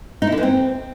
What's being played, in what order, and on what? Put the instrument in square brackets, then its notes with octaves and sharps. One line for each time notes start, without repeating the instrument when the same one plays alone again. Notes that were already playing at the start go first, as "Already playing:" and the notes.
[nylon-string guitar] D#4
E4
D3
E3
C4